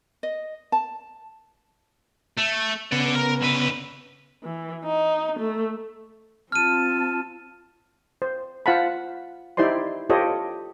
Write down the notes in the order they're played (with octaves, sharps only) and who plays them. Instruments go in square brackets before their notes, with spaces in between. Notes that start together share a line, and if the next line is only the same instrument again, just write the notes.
[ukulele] D#5
A5
[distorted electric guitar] A3
[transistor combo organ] C#3 B3 [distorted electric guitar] D5 F#5
[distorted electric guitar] A#4
D3 B4
[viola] E3
D#4
A3
[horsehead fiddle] C4 F4 [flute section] A5 [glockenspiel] F6 D#7
[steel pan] C5
F4 C5 F5 F#5 A5 B5
D#4 E4 G4 C5 D5 C6
F4 G4 A4 C5 C#5 D#5